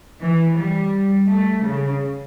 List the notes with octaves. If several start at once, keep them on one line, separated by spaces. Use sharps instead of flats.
E3
G3
A3
C#3